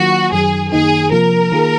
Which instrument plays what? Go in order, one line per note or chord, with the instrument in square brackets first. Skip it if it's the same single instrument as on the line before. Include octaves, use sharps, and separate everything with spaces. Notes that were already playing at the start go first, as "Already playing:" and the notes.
Already playing: [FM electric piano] D#3 F#3 A#3 F4 [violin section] F#4
[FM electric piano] F#2 D#3 F#3 [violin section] G#4
[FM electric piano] F#2 D#3 A#3 D#4 [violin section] G#4
[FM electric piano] C3 F3 A#3 [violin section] A#4
[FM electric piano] D#3 A#3 F4 G#4